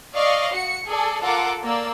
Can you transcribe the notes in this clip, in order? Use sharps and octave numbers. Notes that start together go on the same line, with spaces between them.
D5 D#5 F5 C#6
F#4 C#7
G#4 A4 D5
F4 A4 A#4 F#5 A5 D6
A#3 D5 E6